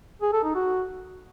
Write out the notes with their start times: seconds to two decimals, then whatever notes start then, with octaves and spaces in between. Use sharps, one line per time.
0.22 G#4
0.33 A4
0.44 D#4
0.55 F#4